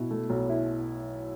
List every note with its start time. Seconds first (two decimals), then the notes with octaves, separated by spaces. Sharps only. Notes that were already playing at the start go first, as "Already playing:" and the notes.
Already playing: B2 E4
0.11 A3
0.30 B1
0.50 E4